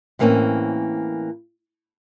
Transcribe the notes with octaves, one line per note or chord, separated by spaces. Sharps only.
A2 E3 A#3 C4 C#4